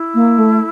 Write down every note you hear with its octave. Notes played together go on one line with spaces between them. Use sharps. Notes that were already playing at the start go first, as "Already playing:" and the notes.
Already playing: E4
A#3
A3